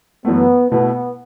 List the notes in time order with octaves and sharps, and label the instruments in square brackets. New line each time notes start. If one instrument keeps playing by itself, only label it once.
[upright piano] F#2 E3 A3 [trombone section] B3
[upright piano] B2 A3 E4 [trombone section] B3